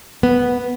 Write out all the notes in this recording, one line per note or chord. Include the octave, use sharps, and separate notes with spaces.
B3